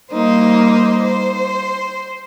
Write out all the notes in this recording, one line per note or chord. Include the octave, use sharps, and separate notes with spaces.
G3 A#3 D#4 C5
C5